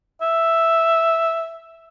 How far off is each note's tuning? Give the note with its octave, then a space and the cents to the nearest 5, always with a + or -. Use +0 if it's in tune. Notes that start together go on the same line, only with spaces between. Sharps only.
E5 +0